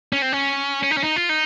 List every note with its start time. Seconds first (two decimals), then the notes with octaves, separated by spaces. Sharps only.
0.13 C#4
0.22 C4
0.32 C#4
0.83 C#4
0.91 D#4
0.98 C#4
1.04 D#4
1.16 F4
1.29 D#4